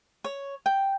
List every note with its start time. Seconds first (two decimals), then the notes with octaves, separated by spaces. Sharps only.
0.24 C#5
0.66 G5